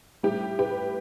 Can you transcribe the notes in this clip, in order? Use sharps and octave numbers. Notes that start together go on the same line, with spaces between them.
A2 G3 G4
G4 B4